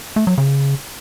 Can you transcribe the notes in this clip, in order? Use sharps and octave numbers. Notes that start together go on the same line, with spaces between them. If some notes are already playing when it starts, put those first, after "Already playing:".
A3
F#3
C#3